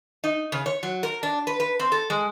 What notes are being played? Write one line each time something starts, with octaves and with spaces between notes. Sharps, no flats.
D#4
C#3
C#5
F#3
A#4
D4
B4
B4
C4
A4
G#3